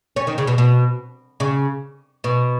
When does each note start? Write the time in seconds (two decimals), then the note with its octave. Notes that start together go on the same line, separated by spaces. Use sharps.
0.16 C#4
0.27 D#3
0.38 C#3
0.47 B2
0.58 B2
1.40 C#3
2.24 B2